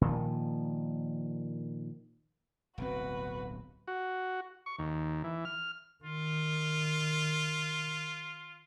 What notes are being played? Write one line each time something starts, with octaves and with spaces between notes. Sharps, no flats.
A#2 D#3 F3
D1 B1 C4 F#4 B4
F#4
C#6
D#2
E3
F6
D#3 F4